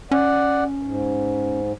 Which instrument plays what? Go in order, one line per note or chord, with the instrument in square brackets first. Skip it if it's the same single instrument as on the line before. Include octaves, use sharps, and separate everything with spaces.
[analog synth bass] C#4 [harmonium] D5 F#5
[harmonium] G#2